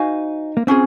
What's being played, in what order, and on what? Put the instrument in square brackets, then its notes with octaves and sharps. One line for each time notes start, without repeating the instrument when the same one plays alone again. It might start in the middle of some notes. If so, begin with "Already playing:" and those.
Already playing: [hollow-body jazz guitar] D#4 [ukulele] F#4 C5 F5 G#5
[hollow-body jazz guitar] A#3
[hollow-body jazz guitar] C4 [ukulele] C#4 F4 G#4